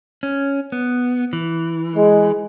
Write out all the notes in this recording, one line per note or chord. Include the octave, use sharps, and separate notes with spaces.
C#4
B3
E3
G#3